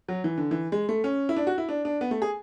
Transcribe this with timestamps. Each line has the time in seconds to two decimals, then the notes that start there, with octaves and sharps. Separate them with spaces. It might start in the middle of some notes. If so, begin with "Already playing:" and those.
0.08 F#3
0.24 E3
0.38 D3
0.51 E3
0.72 G#3
0.89 A3
1.04 C#4
1.29 E4
1.36 D4
1.47 F#4
1.58 E4
1.69 D4
1.85 D4
2.01 B3
2.11 A3
2.22 G#4